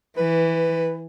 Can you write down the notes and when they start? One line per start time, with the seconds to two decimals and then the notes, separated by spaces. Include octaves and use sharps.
0.17 E3 B4